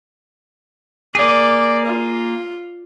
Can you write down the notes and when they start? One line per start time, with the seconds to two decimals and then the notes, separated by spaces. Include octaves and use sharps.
1.15 A#3 G#4 D5
1.86 F4